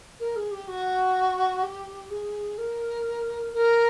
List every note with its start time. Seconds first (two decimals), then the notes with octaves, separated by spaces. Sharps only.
0.20 A#4
0.36 G#4
0.52 G4
0.68 F#4
1.63 G4
2.10 G#4
2.58 A#4
3.53 A#4